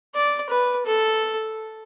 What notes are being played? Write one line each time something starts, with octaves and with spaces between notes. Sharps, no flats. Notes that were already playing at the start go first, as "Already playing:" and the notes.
D5
B4
A4